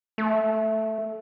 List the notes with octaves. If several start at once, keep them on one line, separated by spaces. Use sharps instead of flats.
A3